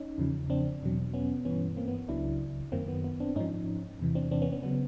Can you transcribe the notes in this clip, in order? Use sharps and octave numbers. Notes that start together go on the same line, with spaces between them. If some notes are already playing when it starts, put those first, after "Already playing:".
Already playing: C#4 D#4
E2 C#3 F3
C4 D4
E2 B2 F#3
B3 C#4
G2 E3 B3 C#4
A#3 C4
B3
C#2 C#3 F#3 D4 E4
F#2 D#3 F#3 A#3 C4
B3
B3
C4 D4
G#2 F3 C#4 D#4
E2 C3 E3
C4 D4
C4 D4
B3 C#4
B3 C#4
C#3 F#3 B3